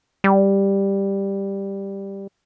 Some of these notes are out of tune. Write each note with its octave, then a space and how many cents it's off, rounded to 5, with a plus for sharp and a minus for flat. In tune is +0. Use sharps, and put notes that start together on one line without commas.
G3 +5